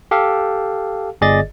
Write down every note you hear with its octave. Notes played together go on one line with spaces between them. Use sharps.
G4 A4 F5
G1 G#4 D5 D#5 A6